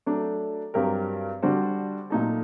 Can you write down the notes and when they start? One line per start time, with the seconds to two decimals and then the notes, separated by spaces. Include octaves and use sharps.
0.06 F#3 A3 D4 A4
0.74 G2 F#3 C4 G4 A#4
1.42 D3 G3 D4 F#4 C5
2.10 A#2 F#3 A3 D#4 A4